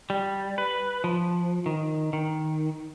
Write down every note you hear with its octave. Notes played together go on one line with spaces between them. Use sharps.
G3
B4
F3
D#3
D#3